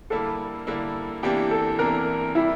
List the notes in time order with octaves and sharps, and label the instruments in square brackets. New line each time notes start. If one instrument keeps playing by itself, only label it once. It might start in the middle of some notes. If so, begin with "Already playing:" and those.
[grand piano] D3 G3 A#3 E4 [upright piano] A4
[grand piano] D3 G3 A#3 E4
[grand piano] E2 C3 E3 A#3 D4 [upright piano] G4
[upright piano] A4
[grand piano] E2 C3 E3 A#3 D4 [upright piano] A#4
[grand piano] C3 G3 [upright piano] E4